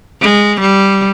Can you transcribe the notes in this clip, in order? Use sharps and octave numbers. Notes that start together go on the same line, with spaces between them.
G#3
G3